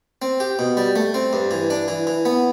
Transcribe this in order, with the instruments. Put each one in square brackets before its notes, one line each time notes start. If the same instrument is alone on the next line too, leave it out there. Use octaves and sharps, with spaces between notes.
[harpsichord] C4
G4
B2
G3
A3
C4
G2
E3
D4
E3
E3
B3